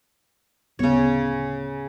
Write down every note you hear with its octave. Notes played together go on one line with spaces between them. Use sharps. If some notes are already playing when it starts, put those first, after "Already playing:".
D1 C#3 B3 C#5